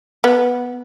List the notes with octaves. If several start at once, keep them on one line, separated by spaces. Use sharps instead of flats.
B3